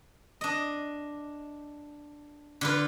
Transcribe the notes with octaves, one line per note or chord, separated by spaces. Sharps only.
D4 D#5
D3 F4 B4